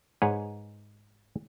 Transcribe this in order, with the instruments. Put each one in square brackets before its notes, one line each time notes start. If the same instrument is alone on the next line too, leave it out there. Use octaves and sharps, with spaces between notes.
[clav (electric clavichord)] G#2 G#4 B4 C#5